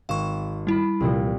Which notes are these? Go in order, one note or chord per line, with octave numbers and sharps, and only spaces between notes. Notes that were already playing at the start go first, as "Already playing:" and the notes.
G#1 F5 C#6 E7
G3 E4 A5 B5
C2 A#2 F3